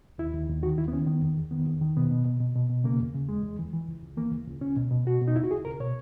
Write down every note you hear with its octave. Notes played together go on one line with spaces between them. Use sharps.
D#2 E4
D#2
D#2
D#3 F#4
D#2 E4
B3
D#3 C#4
D#3 B3
E2
E2
D#3 B3
E2
D#3
B2 B3
B2
B2
B2
B2
B2
C#3 A#3
E2
C#3
E2 G#3
E2
E3
E3
C#2
C#2
E3 A#3
C#2
C#2
C#2 C#4
B2
B2
B2 F#4
B2
D#4
C#2 E4
F#4
C#2 G#4
C#2 A#4
B2 C#5